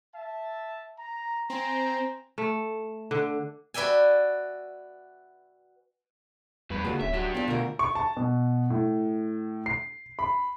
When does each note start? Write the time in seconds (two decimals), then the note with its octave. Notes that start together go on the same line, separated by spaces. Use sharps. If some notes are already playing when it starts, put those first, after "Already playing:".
0.14 E5 A5
0.99 A#5
1.50 C4 C5 G#5 A#5
2.38 A3
3.11 D3
3.74 F#4 B4 D5 E5 G5 G#5
6.70 E2 G2 B4
6.85 C#2 D3 A#3 F#4 G#4
7.01 D1 C#4 E5
7.14 F#3 D4 F#4 G4
7.35 B3 F4 B4 D5
7.48 D2 B2 F4 A#4
7.79 C#6
7.95 A5
8.17 B2
8.70 A2
9.66 C7
10.19 B5